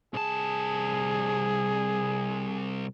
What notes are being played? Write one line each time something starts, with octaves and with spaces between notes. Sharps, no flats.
C2 G#4 A5